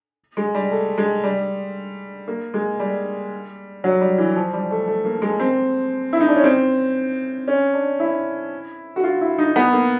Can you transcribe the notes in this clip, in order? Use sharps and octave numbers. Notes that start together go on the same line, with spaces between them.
G#3
G3
A3
G#3
G3
A#3
G#3
G3
F#3
G3
E3
F3
G3
A3
A3
A#3
G#3
C4
E4
D#4
D4
C#4
C4
C#4
D4
E4
F#4
F4
E4
D#4
B3
A#3